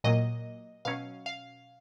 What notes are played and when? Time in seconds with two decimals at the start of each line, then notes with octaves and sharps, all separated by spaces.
0.04 A#2 F#3 A#3 D#5
0.85 B2 F#3 C#4 F5
1.26 F5